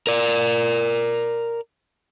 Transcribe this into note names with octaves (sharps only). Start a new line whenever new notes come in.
A#4 D5